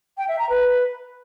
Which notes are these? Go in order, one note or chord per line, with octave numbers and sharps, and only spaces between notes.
G5
E5
A#5
B4